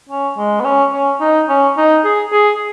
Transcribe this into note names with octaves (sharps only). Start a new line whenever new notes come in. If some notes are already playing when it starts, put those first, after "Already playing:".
C#4
G#3
B3
C#4
C#4
D#4
C#4
D#4
G#4
G#4